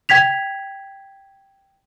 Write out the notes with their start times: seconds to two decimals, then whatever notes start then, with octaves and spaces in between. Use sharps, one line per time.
0.09 G5 G#6 B6 F7